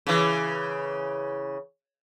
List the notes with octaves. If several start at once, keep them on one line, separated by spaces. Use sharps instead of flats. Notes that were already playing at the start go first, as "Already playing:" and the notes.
C#3 E3